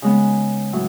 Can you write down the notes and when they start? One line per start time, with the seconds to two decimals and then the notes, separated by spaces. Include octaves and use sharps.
0.02 C#3 G#3 B3
0.73 A2 F#3